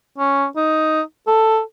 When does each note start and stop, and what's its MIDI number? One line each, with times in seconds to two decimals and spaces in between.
0.18 0.46 61
0.56 1.01 63
1.27 1.60 69